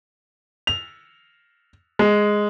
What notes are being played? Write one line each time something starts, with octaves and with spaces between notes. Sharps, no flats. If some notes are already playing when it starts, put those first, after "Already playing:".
F7
G#3